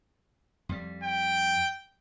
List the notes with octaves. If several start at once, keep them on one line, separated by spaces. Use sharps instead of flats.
F2 G3
G5